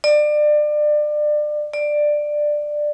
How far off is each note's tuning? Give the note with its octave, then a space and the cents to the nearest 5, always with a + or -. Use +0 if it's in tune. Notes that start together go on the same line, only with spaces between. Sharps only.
D5 +30
D5 +15